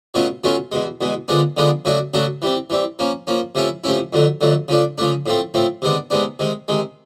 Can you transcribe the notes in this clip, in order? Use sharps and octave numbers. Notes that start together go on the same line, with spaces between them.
B2 F#3 A3 C#4 F4
B2 F#3 A3 C#4 F4
E2 B2 G#3
E2 B2 G#3
D3 F3 G#3 B3 D4
D3 F3 G#3 B3 D4
C#3 F#3 A3 D4 F#4
C#3 F#3 A3 D4 F#4
E3 G3 C4
E3 G3 C4
F3 A#3 C#4
F3 A#3 C#4
C3 F3 A3 C#4 E4
C3 F3 A3 C#4 E4
F2 D3 F#3 A3
F2 D3 F#3 A3
C#3 F3 A3 D4
C#3 F3 A3 D4
A2 F3 A3 C4
A2 F3 A3 C4
C3 D#3 G#3 B3 D4
C3 D#3 G#3 B3 D4
C3 D#3 G#3
C3 D#3 G#3